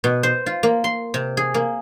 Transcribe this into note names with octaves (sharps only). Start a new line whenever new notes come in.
B2
C5
F4
A#3
C6
C3
G#4
A#3